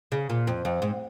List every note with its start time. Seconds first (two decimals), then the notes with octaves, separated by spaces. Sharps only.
0.12 C#3
0.30 A#2
0.47 F2
0.65 F2
0.82 G#2